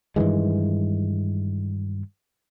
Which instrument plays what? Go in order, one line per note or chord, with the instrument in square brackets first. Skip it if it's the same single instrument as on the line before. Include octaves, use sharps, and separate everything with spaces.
[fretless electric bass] G2 D#3 E3 G#3